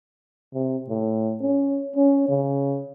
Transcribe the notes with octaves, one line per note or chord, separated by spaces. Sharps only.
C3
A2
C#4
C#4
C#3